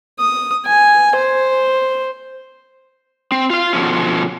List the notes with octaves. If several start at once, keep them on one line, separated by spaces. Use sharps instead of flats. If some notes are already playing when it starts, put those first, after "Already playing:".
D#6
G#5
C5
C4
F4 F5
B2 D3 F3 C#4